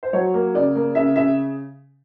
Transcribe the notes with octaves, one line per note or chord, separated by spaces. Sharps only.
C5
F#3 C#5
A#3
C#3 D5
A#3
C#3 E5
C#3 E5